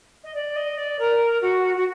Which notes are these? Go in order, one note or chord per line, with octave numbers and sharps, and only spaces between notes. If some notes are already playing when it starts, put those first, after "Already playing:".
D#5
D5
D#5
D5
A#4
F#4
F#4